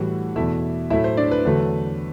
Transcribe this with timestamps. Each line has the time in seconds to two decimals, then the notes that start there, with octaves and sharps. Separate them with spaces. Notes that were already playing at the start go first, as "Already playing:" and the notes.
Already playing: A2 E3 G3 F#4 F#5
0.36 E2 B2 A3 E4 E5
0.90 A2 F#3 A3 E4 E5
1.04 C5
1.17 D4 D5
1.31 B4
1.45 E2 D3 F#3 A3